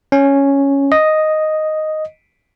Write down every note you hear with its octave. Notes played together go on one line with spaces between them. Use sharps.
C#4
D#5